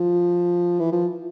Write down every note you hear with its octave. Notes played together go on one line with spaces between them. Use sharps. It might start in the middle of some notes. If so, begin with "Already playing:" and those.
Already playing: F3
E3
F3